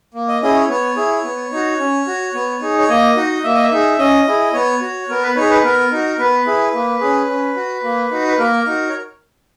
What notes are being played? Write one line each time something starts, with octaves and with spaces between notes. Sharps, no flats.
A#3
D#5
C#4 E4 G#4 D#5
C#5
B3 C#5
E4 G#4
B3
D#4 F#4
C#4
F#4
B3
D#4 G#4
C#5
A#3 D#5
D#4 F#4
A#3 E5
D#5
E5
D#4 G#4
C#4 D#5
E4 G#4
B3 C#5
F#4
B3 A#4
B4
D#4 G#4 C#5
B4
B3 A#4
D#4 F#4
B3 B4
E4 G#4
A#3
C#4 G#4
C#4
F#4
A#3
D#4 F#4
B4
A#3 A#4
D#4 F#4
C#5